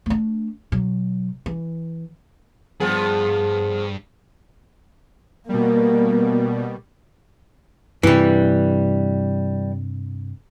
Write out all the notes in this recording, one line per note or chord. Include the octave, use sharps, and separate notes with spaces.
A3 D4
B2 F#3
E3
G2 F3 B3 G#4
B2 G3 A#3
G2 C3 E3 G3